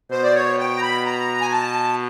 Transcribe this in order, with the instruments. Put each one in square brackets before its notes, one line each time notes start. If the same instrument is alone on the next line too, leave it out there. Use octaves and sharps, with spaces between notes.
[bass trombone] B2 [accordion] C5
[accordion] D5
C#5
G5
A#5
B5
A#5
G#5
A5